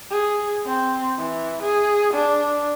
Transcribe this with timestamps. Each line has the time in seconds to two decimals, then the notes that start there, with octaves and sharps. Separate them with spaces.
0.11 G#4
0.66 C4
1.19 E3
1.62 G#4
2.13 D4